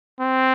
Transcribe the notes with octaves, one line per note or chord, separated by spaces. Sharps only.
C4